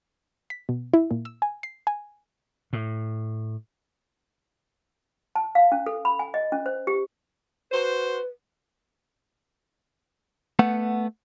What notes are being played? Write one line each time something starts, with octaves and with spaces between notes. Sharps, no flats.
B6
B2
E4
A#2
E6
G#5
C7
G#5
A2
A5
F5
C#4
A4
B5
G#5
D#5
C#4
C5
G4
F#4 B4 C5
A3 B3 F#5